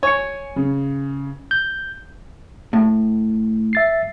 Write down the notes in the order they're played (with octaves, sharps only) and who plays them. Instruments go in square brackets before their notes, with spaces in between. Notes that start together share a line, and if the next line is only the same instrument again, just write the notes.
[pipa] C#5 [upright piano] G#5 C#7
[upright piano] C#3
[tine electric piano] G6
[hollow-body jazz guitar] A2
[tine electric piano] E5 A6 C7